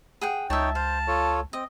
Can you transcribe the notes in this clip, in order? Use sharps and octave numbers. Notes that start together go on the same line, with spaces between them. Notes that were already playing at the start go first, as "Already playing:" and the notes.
G#4 F#5 G5
C#2 D#4 C#5 E5 G5 A5
C5 F5 A5
F4 A4 C#5
C4 D#5